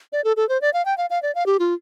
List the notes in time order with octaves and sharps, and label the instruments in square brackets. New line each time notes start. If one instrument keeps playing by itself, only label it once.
[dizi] D5
A4
A4
C5
D5
F5
G5
F5
F5
D5
F5
G4
F4